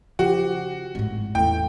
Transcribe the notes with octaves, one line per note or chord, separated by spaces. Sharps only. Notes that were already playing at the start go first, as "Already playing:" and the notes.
C#3 F3 F#4 G4
G#1 A2
E2 C#3 A3 E4 G5